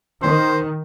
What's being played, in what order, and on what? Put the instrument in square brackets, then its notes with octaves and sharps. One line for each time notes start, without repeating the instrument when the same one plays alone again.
[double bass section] D#3 [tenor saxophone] C5